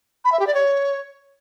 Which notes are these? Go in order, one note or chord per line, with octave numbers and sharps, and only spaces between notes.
B5
E5
G4
D5
C#5